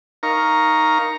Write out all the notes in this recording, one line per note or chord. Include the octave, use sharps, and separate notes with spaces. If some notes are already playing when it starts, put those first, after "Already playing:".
D#4 A#4 F5 A#5 C#6